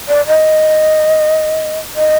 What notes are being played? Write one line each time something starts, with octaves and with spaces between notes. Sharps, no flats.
D5
D#5
D#5